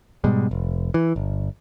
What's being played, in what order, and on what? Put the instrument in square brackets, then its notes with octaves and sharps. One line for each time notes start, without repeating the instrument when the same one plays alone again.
[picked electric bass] G#2 B2 G3 G#3
F1
E3
G1